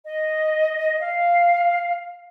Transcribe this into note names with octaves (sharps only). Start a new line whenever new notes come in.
D#5
F5